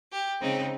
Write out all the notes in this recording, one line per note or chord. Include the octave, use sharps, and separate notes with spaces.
G4
C#3 G#3 C4 D#4